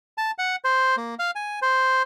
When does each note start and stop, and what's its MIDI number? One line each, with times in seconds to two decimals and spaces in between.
0.18 0.31 81
0.38 0.56 78
0.64 0.96 72
0.97 1.15 58
1.19 1.31 77
1.35 1.59 80
1.62 2.02 72